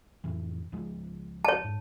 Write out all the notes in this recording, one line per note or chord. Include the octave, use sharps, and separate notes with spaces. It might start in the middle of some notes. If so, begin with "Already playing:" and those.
F2 A2 E3
C#2 F3 G#3
C#5 A5
G#2